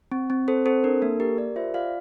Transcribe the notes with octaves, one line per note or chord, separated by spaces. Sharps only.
C4
C4
A4 C5
C4 A4 C5
D4 A#4
A#3 A4
G4 A#4
G4 A#4 D5
F4 C5 E5
F4 D5 F5